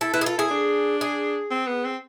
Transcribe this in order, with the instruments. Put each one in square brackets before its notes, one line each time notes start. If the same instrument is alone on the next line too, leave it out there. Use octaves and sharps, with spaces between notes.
[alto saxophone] E4 [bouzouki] A4
[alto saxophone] E4 [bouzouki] B4
[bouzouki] G#4
[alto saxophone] F4 [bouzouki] A4
[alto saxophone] E4 [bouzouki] G#4
[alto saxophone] D4
[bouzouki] G#4
[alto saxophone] C4
B3
C4